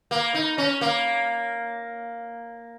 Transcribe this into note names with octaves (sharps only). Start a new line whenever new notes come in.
A#3
D#4
C#4
A#3